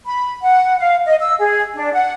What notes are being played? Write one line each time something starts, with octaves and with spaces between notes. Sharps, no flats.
B5
F#5
F5
D#5
E6
G#4
D4
F#5